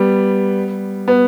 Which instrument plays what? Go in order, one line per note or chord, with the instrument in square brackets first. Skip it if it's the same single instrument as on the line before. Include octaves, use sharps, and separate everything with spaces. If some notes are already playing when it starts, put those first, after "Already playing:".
Already playing: [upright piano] G3 B3
B3